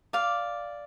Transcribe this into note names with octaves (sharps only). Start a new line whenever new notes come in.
D5 F5